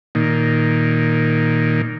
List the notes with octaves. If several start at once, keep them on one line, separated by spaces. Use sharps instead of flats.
A#2 D#3